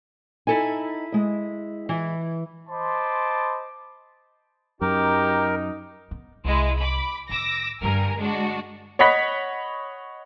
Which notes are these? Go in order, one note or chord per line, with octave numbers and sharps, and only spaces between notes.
D#4 E4 A4 G#5
G#3 D#5
E3
C5 D#5 A5 B5 C6 D6
F#2 D#4 G4 A#4
B3
C2 F2 G#3 E4
B5 D6
A2 D#3 D6 E6 A#6
G2 D3 A#3 A#4 G#5
G#3 D4 F#4
C#5 D#5 F#5 B5 B6